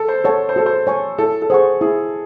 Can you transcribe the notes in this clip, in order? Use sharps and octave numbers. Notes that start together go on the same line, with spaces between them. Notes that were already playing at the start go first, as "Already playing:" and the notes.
Already playing: A4
C5
A4 C#5 F#5 A5
C5
F#4 A4
C5
C#5 G#5 C#6
E4 A4
A4
G#4 C5 F#5 C#6
E4 G#4